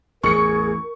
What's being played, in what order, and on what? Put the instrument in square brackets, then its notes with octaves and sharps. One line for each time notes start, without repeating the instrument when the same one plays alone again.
[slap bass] A1 E2 [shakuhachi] G#4 [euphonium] A#4 [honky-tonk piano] C#6 C#7